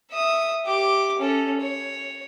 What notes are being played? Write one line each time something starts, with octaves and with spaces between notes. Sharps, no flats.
E5 D#6
G4 D6
C#4 A4
C#5